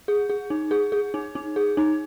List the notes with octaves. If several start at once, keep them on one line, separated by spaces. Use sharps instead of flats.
G#4
G#4
D#4
G#4
G#4
D#4
D#4
G#4
D#4